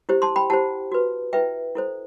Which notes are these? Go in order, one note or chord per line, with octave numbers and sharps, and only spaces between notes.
E4 G4 C5
A5 C6
G5 B5
E4 G4 C5 F#5 A5
F#4 B4
E4 B4 E5 G5
E4 A4 C5